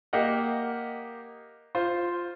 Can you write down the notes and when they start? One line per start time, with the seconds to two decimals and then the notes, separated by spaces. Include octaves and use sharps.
0.13 A#3 G4 A#4 D#5 F#5
1.75 F4 C5